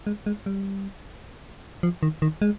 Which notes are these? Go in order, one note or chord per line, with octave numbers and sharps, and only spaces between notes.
G#3
G#3
G3
F3
D#3
D#3
G#3